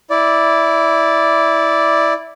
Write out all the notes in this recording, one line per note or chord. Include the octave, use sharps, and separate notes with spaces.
E4 D5